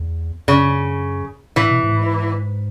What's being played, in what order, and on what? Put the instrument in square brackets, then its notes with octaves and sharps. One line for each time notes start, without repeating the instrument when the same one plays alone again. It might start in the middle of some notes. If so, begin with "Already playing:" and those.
Already playing: [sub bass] E2
[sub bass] F#2 [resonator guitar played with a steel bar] C#3
[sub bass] A2 [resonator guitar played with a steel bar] E3
[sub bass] B2
G#2
A2
G#2